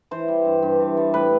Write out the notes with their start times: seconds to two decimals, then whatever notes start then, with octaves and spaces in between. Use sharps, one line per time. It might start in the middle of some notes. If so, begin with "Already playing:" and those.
0.11 E3 C5
0.28 G3
0.45 G2
0.63 G2
0.80 E3
0.97 G3
1.14 A2 B4